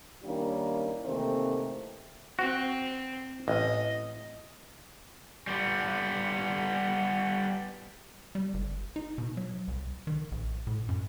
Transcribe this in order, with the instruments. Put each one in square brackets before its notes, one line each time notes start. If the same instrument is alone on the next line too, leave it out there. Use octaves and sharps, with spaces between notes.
[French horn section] D#3 G3 A#3 C#4 D4 E4
C3 D#3 E3 A3 A#3 C4
[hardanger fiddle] C4 [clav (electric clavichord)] F#4
[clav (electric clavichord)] A1 [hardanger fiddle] D#5
[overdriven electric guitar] G3 B3
[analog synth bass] G3
G1
D#4
B2
F#3
C2
D#3
A#1
A2
F#2